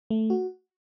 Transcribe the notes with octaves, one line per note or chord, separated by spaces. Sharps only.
A3
F#4